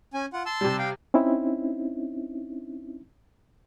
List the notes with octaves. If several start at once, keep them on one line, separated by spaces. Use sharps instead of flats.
C#4 G#5
F4 F#5
A5 C6 E6
C3 G3
F5 G5
C4 C#4 D#4 E4